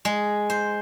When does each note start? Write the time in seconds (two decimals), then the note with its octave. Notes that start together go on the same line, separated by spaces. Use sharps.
0.05 G#3
0.50 C5